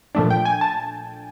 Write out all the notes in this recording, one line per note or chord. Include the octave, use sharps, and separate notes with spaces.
A#2 F3 A3 D4
G5
G#5
A5